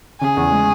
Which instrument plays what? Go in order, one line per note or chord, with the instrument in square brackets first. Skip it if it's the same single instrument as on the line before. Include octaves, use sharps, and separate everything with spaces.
[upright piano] C#3 [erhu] G#4
[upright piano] E2
G#3